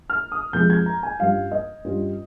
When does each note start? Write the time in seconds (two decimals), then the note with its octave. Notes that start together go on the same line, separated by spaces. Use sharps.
0.10 F6
0.32 D#6
0.53 F2 C3 F3 G#3 G6
0.70 G#6
0.86 A#5
1.03 G#5
1.19 G2 G3 C#4 F4 F5
1.52 D#5
1.85 G2 G3 C#4 F4